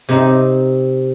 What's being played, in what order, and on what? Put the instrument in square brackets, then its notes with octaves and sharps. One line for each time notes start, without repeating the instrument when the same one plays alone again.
[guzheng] C3 C4 D#4